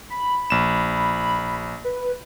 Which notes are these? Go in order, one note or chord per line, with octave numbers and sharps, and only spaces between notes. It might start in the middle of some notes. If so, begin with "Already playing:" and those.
B5
A#1 E7
B4